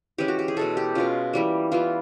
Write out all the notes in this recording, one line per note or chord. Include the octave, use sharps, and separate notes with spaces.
E3 G#3 C#4 G4
F#4
G4
G#4
B2 G#3 C#4 A4
G4
B2 G#3 C#4 F4
E3 G3 A#3
E3 G3 B3 F4